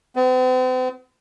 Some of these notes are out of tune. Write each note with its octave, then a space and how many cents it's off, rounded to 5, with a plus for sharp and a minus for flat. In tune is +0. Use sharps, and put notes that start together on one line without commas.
C4 -45